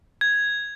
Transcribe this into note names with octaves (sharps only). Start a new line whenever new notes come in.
G#6